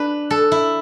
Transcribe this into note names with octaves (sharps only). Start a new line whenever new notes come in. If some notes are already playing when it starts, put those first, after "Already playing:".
Already playing: D4 B4
A4
E4